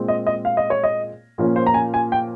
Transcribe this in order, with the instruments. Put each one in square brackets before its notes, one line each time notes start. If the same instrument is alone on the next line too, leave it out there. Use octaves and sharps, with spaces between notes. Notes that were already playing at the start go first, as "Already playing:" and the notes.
Already playing: [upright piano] A#2 G#3 C4
D#5
D#5
F5
D#5
C#5
D#5
A#2 F3 A#3 C#4
C5
A#5
G#5
G#5
G5